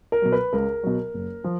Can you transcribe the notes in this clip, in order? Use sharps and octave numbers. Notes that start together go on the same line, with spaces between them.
A#4
B2 F#3
B4
C#2 A#4
B2 F#3
F#1
F3